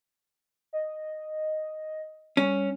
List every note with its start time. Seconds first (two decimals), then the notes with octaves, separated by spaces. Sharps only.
0.73 D#5
2.37 G3 C#4